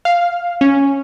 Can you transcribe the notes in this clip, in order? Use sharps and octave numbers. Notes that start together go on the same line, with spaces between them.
F5
C#4